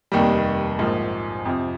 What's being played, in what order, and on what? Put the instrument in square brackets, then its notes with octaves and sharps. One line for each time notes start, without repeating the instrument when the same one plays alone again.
[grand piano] F1 D#2 D#3 G3
A#1 G#2 F3 A#3
F2 C3 F3